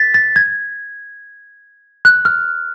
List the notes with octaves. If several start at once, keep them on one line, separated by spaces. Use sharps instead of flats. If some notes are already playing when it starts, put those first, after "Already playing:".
Already playing: A6 B6
A6
G#6
F#6
F6